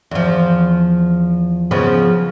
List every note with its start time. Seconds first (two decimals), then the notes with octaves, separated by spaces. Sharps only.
0.11 E2 F3
1.71 C#3 F3 B3